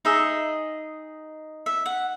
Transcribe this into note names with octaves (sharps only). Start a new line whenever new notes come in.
D#4 G#4 D#5 E5
E5
F#5